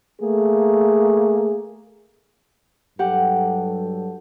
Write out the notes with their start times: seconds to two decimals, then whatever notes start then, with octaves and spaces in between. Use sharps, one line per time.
0.20 A3 A#3 G#4
2.99 G2 F#3 G4 A4 F#5